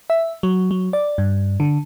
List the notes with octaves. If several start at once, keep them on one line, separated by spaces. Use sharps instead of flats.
E5
F#3
F#3
D5
G2
D3